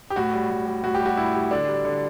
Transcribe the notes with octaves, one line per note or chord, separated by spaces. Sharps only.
G4
A2 F#4
G3
A2
G3
A2 F#4
G4
G3
F#4
A2 E4
G3
D3 D4
G3
D3